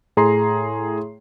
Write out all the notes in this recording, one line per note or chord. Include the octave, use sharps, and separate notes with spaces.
A2 G#4 A#5 C6 C7